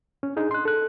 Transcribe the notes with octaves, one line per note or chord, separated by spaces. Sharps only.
C#4
D4 D#4 G#4
C6 F#6
A4 F#6